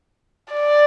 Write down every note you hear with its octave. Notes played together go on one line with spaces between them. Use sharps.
D5